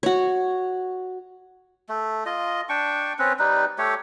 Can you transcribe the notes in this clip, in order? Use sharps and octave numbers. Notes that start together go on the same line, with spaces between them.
F#4 C#5
A3
F4 D#5
D4 G5 C#6
C4 C#4 B4
G3 D#4 B4
A3 G4 C#5